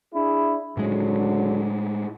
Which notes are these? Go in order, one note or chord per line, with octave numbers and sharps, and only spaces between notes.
D4 E4 G#4
C#2 A2 D3 F#3 G#3